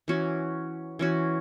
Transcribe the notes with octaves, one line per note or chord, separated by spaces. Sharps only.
E3 C#4 F#4
E3 C#4 F#4